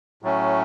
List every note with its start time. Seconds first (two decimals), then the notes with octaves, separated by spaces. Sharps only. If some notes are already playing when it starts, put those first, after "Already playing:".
0.22 A2 F#3 A3 C#4